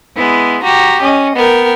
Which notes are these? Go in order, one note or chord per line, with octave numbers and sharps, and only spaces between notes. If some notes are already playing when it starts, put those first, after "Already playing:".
G#3 B3 E4
F#4 G4 A#5
C#4 D#5
B3 A#4 G5